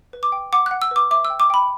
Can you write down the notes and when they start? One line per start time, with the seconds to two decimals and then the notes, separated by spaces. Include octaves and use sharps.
0.13 B4
0.23 D6
0.32 G5
0.53 F#5 D6
0.66 F#5 F#6
0.82 E6
0.91 B4 D6
1.11 E5 D6
1.25 E6
1.30 G5
1.40 D6
1.50 G5 B5